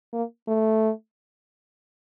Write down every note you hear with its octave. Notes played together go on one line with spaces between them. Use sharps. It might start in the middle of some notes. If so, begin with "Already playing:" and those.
A#3
A3